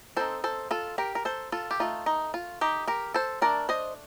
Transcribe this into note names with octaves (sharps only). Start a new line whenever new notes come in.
G3 C4 D#4 A4 C5
A4 C5
F4 A4
G4 A#4
A#4
A4 C5
F4 A4
G4
A3 D#4 F4
D#4
F4
D#4 G4
G4 A#4
A4 C5
A3 D4 A#4 D5
C5 D#5